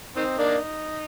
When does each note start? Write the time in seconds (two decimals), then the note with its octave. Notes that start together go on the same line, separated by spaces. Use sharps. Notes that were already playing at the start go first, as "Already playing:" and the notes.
0.16 D#3 C4 D#4
0.38 A#3 D4